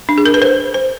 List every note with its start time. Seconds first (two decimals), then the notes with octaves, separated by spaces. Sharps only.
0.09 D4
0.18 G#4
0.26 A#4
0.34 B4
0.42 C5
0.74 C5